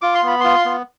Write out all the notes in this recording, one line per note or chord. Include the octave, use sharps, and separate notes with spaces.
F4 D6
C6
B3 B5
F4 C6
B3